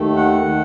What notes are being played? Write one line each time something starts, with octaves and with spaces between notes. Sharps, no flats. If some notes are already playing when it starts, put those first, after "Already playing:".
Already playing: D#2 D#3 A3
F#5
D#3 A3